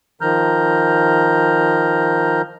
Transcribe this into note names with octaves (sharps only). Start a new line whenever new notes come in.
D#3 F3 A#5 F6 G6